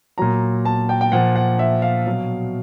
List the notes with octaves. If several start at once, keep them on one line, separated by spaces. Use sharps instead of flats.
A#2 F#3 A#5
A5
G5
G5
A#2 F3 F#5
F#5
E5
F5
B2 F#3